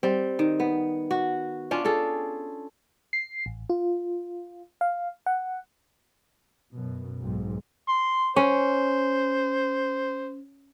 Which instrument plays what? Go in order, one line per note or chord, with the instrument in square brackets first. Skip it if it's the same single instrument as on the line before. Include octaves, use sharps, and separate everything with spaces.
[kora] G3 C4
D#3
B3
F#4
C#4 D4 F4
F4 G#4 A4
[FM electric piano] C7
A1
F4
F5
F#5
[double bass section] F#2 B2
B1 G#2
[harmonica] C6
[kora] C#4 [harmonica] C5